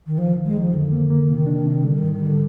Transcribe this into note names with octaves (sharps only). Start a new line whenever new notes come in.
D#3
C2 F3
D#3
G#3
D#3 F3
F2 D3
A#3
A#3
C3 D#3
D4
C3
D3 G3
G#2 D#3
D#3
D3 G3